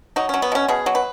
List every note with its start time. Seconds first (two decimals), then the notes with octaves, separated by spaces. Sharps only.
0.16 F#3 D#4
0.29 C#4
0.34 F#3
0.42 B3
0.52 B2 C#4
0.68 B2 G#4
0.86 F#3
0.95 B4